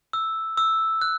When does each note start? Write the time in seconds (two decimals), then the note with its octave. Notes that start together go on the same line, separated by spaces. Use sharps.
0.13 E6
0.57 E6
1.01 F#6